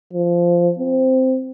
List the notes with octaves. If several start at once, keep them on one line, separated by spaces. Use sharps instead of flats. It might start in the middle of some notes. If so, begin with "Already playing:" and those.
F3
C4